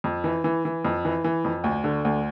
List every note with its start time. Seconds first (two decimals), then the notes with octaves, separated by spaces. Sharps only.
0.04 F2
0.24 E3
0.44 E3
0.65 E3
0.85 F2
1.05 E3
1.24 E3
1.45 F2
1.64 D2
1.84 D3
2.05 D2